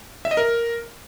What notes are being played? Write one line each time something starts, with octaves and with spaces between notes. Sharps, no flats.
E5
D#5
A#4